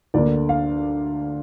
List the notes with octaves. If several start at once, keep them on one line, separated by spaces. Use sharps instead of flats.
D2 D3 A#3 D5
F5